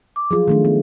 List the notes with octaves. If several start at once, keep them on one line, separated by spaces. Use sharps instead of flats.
D6
F3 F#3 F4 G#4
D#3 A3 D4
B3